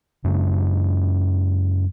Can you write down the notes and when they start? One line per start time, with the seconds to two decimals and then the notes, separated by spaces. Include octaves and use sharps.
0.24 F#2 C#3 G#3 D4